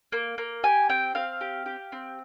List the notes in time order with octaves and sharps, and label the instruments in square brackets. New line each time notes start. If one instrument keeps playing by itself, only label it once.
[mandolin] A#3
A#3
G4 G#5
C4 G5
C4 F5
G4
G4
C4